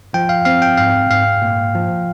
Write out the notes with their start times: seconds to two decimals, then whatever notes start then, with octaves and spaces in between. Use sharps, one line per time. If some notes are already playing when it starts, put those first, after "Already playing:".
0.14 F3 G5
0.29 F5
0.45 C4 F5
0.62 G5
0.77 G#2 F5
1.10 G#2 F5
1.42 A#2
1.75 F3